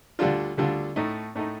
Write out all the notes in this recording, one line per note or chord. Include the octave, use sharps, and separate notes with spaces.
D2 D3 G3 D4 F4
D2 D3 G3 D4 F4
A2 A3 D#4
A2 A3 D#4